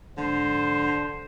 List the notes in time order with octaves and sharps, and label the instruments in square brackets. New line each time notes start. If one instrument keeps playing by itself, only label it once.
[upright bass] F2 G#2 [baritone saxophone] D3 [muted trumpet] C5